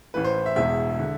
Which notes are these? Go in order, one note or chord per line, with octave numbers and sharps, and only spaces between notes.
A1 A2 E3 B4
C5
E5
E1 E2 B2 E5
D3